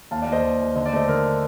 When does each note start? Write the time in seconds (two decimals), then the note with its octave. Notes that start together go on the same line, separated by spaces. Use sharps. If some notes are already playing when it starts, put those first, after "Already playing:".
0.11 D#2 F5 A5
0.22 D#2 D5 F5
0.32 C5 D#5
0.44 D#2
0.60 D#2
0.75 D3 D#5
0.86 D5
0.93 A3 C5 D#5
1.08 D3 A#4